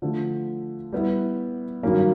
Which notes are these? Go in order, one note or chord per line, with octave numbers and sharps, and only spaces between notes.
D3 F3 A3
G3 B3 E4
G2 D#3 F#3 A#3 C#4